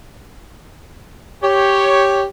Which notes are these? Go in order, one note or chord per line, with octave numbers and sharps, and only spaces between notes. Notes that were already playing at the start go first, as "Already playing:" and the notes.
G4 C#5